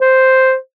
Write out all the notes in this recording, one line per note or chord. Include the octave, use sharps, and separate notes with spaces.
C5